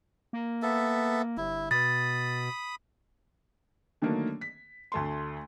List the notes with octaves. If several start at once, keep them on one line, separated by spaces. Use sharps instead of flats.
A#3
B3 A4 E5
G1 E4
B2 B5 D#6 A6
D3 D#3 F#3 A3 A#3 D4
B6
D2 A3 C6